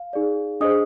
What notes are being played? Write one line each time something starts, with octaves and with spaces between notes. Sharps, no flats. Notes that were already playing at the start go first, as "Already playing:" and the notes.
Already playing: F5
D#4 G#4 D5
D4 G#4 C5 D#5 D#6